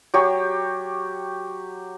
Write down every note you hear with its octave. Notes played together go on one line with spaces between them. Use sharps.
F#3 G4 C#6